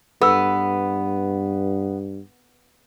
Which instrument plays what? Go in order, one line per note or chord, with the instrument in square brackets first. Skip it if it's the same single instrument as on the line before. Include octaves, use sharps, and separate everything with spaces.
[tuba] G2 [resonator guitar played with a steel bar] B3 [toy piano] A4 B4 E6